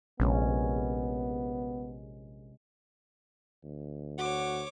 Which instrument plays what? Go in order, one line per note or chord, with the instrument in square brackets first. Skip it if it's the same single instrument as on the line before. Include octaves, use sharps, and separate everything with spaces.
[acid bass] A#1 [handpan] C3 G#3 C#4 [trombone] B3
[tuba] D2
[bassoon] F#4 [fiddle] C#5 D6